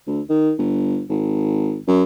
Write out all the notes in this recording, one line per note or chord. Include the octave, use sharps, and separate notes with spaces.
D2
D#3
G1
G#1
F#2